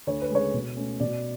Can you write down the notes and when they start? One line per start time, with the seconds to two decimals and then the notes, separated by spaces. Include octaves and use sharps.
0.07 D2 C#5
0.21 B4
0.30 C#3 G#3 C#5
0.54 B2
0.76 A3 C#4
1.00 B2 D5